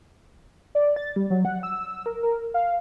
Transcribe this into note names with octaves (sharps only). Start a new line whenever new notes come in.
D5
A6
G3
F#3
F#5
E6
A#4
A#4
F5